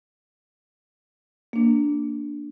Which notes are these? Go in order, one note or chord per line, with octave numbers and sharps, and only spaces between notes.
A#3 D4